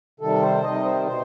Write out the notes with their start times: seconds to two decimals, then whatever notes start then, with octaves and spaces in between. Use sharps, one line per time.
0.20 C3 D#3 G3 A4
0.42 C5
0.64 C3 D#3 G3 D#5
0.85 C5
1.07 B2 C5